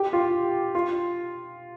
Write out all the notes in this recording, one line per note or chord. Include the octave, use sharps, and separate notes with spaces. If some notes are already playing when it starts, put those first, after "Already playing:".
Already playing: G4
F4
F4